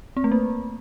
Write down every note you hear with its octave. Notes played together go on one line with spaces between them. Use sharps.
C4
A3
A#3